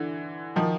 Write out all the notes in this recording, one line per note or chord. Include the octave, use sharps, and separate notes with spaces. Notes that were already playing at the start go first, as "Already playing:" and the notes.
Already playing: D3 E3
D#3 F3